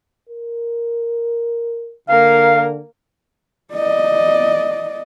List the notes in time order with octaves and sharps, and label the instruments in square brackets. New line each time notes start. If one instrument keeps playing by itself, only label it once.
[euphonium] A#4
[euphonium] D3 [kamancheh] A#3 A#4 [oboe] F5
[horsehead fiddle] D5 D#5